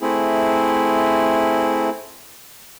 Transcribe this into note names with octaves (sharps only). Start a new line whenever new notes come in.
A3 C4 E4 G#4